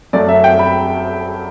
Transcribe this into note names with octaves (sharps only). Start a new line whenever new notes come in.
F#2 F#3 A3 D5
E5
G5
B5